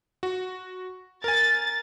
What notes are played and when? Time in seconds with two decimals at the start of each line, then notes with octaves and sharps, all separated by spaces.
0.23 F#4
1.24 A#4 G#5 A6